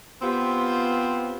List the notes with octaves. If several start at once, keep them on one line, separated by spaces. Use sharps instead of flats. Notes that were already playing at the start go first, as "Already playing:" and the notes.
B3 C4 F4 G4